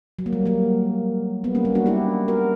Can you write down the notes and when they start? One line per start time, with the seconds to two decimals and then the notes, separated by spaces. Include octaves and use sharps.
0.19 F#3
0.26 A#3
0.33 G3
0.46 F#3 A#3
1.44 G3 B3
1.55 A#3 C#4
1.65 G3 B3
1.75 D4 F#4
1.86 E4 G4
2.28 F#4 A#4